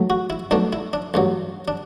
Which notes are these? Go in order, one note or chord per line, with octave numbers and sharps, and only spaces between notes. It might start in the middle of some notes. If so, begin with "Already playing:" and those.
Already playing: B1 A2 F#3 A3
F#4
E4
B1 B2 A3 D4
E4
D4
A1 G2 F#3
D4